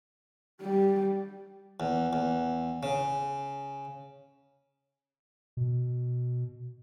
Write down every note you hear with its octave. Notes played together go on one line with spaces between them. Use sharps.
G3
E2
E2
C#3
B2